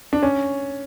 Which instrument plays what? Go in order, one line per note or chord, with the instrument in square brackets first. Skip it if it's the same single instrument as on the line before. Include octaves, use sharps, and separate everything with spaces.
[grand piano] D4
C#4